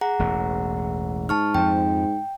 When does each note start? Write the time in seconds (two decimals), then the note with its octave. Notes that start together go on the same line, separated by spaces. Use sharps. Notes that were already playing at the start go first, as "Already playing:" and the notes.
0.01 G#4 F#5 A#5
0.19 E1 A1 E2
1.29 G#2 A5 C#6 F6
1.54 F2 F3 G5